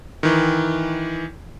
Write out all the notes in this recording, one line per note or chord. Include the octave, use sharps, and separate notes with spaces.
D#3 E3